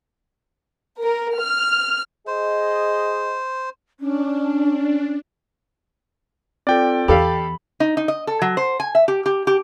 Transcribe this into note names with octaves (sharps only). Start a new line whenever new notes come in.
A#4
F6
G#4 C5 D#5
C#4 D4
C4 F4 A4 D5 G5
E2 G4 A4 F5 B5
D#4
D#4
D#5
A4
F#3
C5
G#5
E5
G4
G4
G4